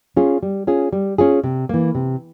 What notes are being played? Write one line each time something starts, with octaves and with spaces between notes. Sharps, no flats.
C#4 F4 G#4
G3
C#4 F4 G#4
G3
C#4 F4 G#4
C3
E3 A#3
C3